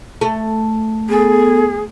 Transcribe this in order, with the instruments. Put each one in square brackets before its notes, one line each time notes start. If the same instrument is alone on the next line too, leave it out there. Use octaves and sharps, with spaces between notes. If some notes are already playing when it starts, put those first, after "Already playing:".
[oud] A3
[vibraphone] B3 A4 [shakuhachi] G#4